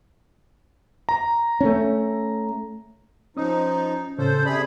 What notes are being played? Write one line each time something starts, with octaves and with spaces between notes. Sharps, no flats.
A#5
A3 C#4
F3 C#4 D#4 D#6
A2 C#3 C#4 A4 C5
C3 G#4 D5 B5